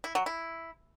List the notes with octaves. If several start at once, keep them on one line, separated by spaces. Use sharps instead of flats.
E4
F#3
E4